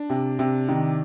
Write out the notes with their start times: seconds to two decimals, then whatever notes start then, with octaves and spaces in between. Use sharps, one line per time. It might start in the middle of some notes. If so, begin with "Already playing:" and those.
Already playing: D4
0.10 C3
0.39 C3
0.69 D#3